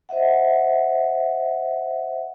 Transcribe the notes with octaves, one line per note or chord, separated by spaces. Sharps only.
C5 D#5 E5 F#5